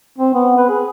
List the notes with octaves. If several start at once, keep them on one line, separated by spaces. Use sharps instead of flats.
C4
B3
B4
G#4